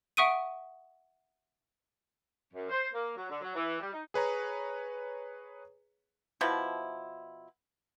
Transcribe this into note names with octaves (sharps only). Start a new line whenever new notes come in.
E5 F#5 C#6 D#6 D7 D#7
F#2
C5
A#3
F#3
D3
F#3
E3
G3
D#4
G#4 B4 C#5 A#5
B2 F3 E4